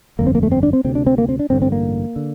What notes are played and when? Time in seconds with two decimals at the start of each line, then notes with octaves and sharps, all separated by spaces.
0.19 G1 F2 D3 A#3
0.27 C4
0.35 A#3
0.43 A3
0.52 C4
0.63 D4
0.73 C4
0.84 D2 C3 C4
0.95 D4
1.07 C4
1.18 A#3
1.29 C4
1.39 D4
1.50 A1 G2 D3 C4
1.62 C4
1.72 A#3
2.16 D3